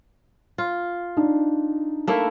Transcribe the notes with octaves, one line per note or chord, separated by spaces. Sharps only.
F4
D4 D#4
A3 A#3 E4